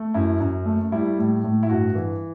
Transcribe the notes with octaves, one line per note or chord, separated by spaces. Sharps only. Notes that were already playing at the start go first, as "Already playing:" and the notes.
Already playing: A3
F#2 E4
F#2
A3
G3 E4
A2
A2
E4
G2 F#4
E3